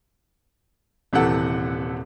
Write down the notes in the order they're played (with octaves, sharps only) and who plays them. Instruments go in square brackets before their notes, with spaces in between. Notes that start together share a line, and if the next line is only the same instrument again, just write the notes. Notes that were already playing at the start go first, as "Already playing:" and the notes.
[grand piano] D#1 C3 E3 A4 F#5